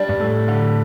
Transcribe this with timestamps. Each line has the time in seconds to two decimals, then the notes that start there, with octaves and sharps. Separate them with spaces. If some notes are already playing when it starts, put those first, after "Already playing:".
Already playing: G3 D4
0.09 G2
0.20 A2 A4
0.48 D3